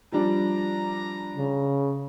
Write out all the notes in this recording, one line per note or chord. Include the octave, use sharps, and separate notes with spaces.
F3 G3 D4 A#5
C#3